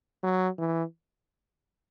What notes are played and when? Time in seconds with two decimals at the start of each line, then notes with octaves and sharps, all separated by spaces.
0.23 F#3
0.58 E3